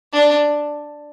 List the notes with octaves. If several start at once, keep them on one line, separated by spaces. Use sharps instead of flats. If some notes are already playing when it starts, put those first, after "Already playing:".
D4